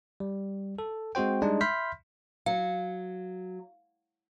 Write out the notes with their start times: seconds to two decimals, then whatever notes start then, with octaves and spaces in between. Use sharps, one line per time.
0.20 G3
0.79 A4
1.15 G#3 C4 F#4 C5 G5
1.42 G3 G#3 D4 D#4
1.61 E5 B5 C6 F6 G6 B6
2.46 F#3 F5